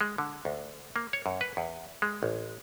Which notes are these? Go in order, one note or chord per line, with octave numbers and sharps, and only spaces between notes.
G#3
D3
D2
A#3
C#5
F#2
B4
E2
G#3
A1